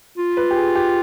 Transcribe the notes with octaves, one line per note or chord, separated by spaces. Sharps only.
F4
B4
G4
G#4
G4